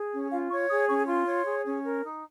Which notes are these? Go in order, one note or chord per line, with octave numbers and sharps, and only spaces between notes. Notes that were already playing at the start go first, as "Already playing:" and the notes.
Already playing: G#4
C#4
F4 F5
C#5 C#6
G#4 D#6
C#4 C#6
F4 C6
C#5
G#4
C#4
A#4
D#4